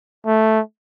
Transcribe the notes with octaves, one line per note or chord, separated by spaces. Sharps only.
A3